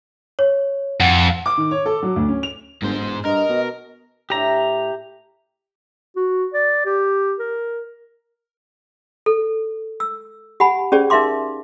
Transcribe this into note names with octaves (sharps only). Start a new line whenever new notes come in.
C#5
F2 F#5
D6
D#3
C#5
A4
F#3
D2
C#4
F7
G1 G#2 C5
E1
G2 A#4 D#5
B2
A2 D4 G4 E5 A#5
F#4
D5
G4
A#4
A4
E6
G4 F#5 G#5 B5
C#4 G4 G#4 C5 D5
D#4 A#4 E5 F5 C6 D6